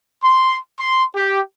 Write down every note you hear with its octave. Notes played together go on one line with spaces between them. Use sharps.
C6
C6
G4